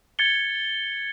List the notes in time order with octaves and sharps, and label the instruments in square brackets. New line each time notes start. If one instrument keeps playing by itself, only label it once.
[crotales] G#6 A6 C#7 G7